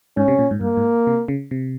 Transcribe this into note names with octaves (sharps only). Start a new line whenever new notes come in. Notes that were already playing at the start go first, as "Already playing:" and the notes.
G#2 C#4
C3
A#2
G#2
G2 A#3
G#2
C3
C#3
C3